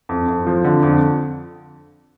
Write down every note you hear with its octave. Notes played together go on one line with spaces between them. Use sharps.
F2
F2
F3
D3
F2